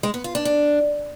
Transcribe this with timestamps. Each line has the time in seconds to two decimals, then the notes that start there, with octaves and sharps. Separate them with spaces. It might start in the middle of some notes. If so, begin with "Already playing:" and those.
0.03 G#3
0.14 B3
0.24 F4
0.35 D4
0.45 D4